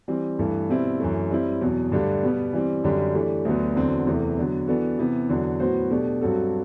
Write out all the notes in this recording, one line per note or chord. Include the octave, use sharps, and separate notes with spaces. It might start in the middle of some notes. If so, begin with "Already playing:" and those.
E3 G3 C4
G2 E3 A3
B2 G3 C4 E4
F#2 E3 A3
G3 C4 E4
E2 B2 F#3
G2 D3 A3 D4 G4
B2 G3 B3
E3 G3 C4
F#2 D3 G3 D4 G4
E3 A3 D4 G4
D2 D3 F#3 B3
E2 D3 F#3 C4
E2 C3 E3 A3
D3 F#3 B3 D4
E3 B3 D4 F#4 A4
C3 E3 B3
E2 D3 F#3
A2 F#3 B3 F#4 C5
B2 A3 D4 G4
G2 F#3 C4 F#4 A4